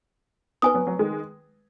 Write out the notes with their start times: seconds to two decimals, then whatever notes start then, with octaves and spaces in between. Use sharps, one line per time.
0.62 B3 D#4 B4 G#5 D#6
0.74 F#3 B3
0.87 F#3
0.99 D#3 G#3